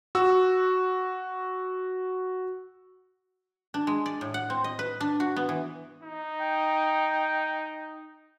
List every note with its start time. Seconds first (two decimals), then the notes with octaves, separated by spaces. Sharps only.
0.15 F#4 E6
3.74 D4
3.87 G#3
4.06 D5
4.21 A2
4.34 F#5
4.50 C4
4.64 D#5
4.79 B4
5.01 D4
5.20 F#4
5.36 B3
5.49 E3
6.02 D#4
6.41 G5